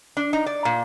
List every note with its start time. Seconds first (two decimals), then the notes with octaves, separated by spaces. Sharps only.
0.17 D4
0.33 D#4
0.46 D5
0.65 A#2